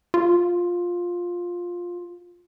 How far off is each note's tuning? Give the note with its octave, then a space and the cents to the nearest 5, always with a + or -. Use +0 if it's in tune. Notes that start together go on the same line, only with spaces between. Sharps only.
F4 +10